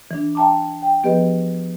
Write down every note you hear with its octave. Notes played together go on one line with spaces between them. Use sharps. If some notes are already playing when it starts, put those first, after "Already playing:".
E3 D4
E5 G5 A5 A#5 D6
G5
F3 B3 G4 G#4 B4 D#5